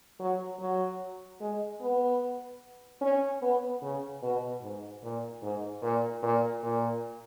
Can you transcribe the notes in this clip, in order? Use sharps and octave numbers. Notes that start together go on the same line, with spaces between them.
F#3
F#3
G#3
B3
C#4
B3
C#3
B2
G#2
A#2
G#2
A#2
A#2
A#2